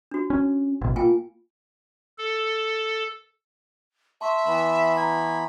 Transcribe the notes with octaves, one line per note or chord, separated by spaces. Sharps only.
D4 F#4
C#4
A1 B2
A#3 F4 G5 G#5
A4
E5 A5 C6 C#6
E3 B3 B5
A#5 G#6